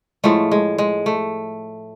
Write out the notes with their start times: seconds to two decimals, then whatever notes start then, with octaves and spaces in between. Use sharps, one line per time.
0.24 A2 F3 G#3 A3
0.52 G#3
0.78 G#3
1.06 A3